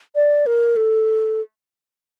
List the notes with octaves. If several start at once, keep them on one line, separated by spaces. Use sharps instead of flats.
D5
A#4
A4